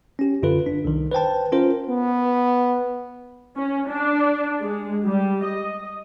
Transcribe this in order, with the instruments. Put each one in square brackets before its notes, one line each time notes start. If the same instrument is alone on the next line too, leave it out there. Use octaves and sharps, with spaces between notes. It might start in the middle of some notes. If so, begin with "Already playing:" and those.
[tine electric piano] C#4 G4
G#1 F#2 D3 F4 A4 B4
D4
C2 D#3
B4 C5 G5 A5
C#4 F4 A#4 C5
[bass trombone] B3
[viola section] C#4
D4
G#3
G3
D#5